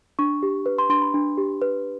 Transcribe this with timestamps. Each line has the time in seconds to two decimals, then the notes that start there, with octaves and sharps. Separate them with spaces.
0.19 D4 C#6
0.43 G4
0.66 B4
0.78 C6
0.89 D4 C6
1.02 B5
1.14 D4
1.37 G4
1.62 B4